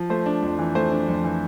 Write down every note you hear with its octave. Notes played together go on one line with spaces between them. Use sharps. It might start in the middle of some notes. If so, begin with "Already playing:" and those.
Already playing: F3
A3 C5
D4
F2
E3
A3 C5
D4
F2
E3